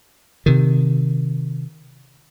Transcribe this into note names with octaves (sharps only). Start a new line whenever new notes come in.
C3 D#3